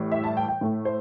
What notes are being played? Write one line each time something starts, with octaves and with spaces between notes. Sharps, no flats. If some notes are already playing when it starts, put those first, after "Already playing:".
Already playing: A2 E3 G3
E5
A5
G5
G5
A2 A3
C5